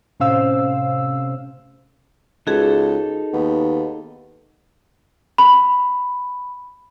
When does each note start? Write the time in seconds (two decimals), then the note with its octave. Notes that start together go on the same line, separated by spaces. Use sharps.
0.20 A2 C3 C#4 C5 F5 E6
2.47 C#2 D#4 F#4 G#4 A4 B4
3.33 D#2 B3
5.38 B5